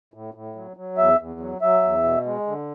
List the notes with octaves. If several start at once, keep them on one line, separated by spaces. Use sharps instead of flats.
A2
A2
F#3
F#3
E2 E5
E2
F#3
F#3 E5
E2
B2
G#3
D3